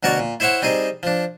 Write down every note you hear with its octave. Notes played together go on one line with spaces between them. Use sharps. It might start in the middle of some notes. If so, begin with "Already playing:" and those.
D2 B2 F#4 A#4 C#5 D5
A#2
E4 C5 C#5 E5 F#5
G3 C4 D#4 G#4
F3 D4